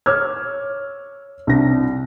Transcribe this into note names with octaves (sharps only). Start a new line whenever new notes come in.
C#5 D6 E6 F6 G#6
C2 D4 A#6